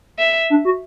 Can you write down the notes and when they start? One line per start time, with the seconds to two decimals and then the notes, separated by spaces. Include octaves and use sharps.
0.19 E5
0.50 D4
0.65 F#4